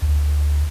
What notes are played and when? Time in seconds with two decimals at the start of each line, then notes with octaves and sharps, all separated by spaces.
0.02 D2